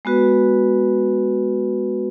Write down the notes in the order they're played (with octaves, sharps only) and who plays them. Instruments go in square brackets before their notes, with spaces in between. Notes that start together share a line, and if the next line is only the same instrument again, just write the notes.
[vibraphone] G#3 B3 F#4 B4